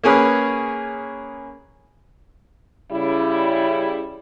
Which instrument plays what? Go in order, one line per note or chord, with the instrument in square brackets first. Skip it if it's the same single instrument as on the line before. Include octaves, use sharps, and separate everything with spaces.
[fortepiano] A#3 C#4 G#4 B4
[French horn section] C#3 G3 E4